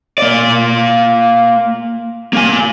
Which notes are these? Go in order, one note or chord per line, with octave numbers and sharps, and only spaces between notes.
A#3 D5
A#3 G#5